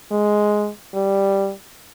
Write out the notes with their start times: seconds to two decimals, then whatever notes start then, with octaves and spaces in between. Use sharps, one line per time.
0.11 G#3
0.94 G3